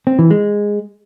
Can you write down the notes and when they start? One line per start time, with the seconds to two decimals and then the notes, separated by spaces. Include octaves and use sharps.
0.07 C4
0.19 E3
0.31 G#3